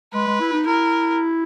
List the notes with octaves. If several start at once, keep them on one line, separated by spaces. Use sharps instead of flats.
G#3 B4
G#3
E4
D#4
E4 A#4